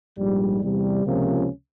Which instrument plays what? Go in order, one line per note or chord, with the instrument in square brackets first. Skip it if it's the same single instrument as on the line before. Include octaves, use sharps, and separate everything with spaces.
[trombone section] A#1 G#2 G3
E2 C3 G3
C#2 C3 F3 A#3 C#4